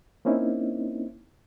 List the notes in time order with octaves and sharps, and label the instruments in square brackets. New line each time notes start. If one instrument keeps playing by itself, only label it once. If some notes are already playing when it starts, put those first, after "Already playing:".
[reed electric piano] A#3 C4 C#4 D#4 E4